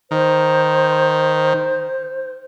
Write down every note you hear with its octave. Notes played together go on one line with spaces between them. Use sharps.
D#3 C5